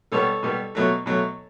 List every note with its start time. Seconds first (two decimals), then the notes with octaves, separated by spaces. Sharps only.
0.12 B2 G3 B3 A4 C#5
0.43 B2 G3 B3
0.75 B2 F#3 A3
1.06 B2 F#3 A3